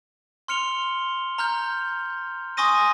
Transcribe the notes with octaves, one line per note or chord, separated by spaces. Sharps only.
C6 F6 C#7 F7 G7
A#5 F6 G6
G#5 C6 C#6 D#6 A#6 D#7